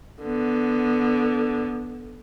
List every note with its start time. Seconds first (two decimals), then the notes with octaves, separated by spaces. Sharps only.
0.23 D3 B3